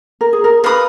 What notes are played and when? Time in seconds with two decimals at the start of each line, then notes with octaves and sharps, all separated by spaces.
0.21 A#4
0.33 G#4
0.44 A#4
0.64 A#4 B4 F5 B5 D#6